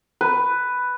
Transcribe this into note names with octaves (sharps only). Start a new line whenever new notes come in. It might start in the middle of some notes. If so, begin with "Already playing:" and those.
B4